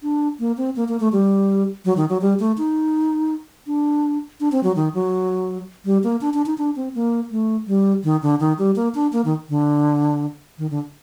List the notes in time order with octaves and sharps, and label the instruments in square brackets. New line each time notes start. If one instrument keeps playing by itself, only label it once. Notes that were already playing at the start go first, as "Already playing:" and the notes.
[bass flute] D4
A#3
C4
A#3
A#3
A3
G3
F#3
D#3
F#3
G3
A3
D#4
D4
D4
C4
F#3
D#3
F#3
G3
A#3
D4
D4
D#4
D4
C4
A#3
A3
G3
D#3
D3
D#3
G3
A#3
D4
A#3
D#3
D3
D#3
D3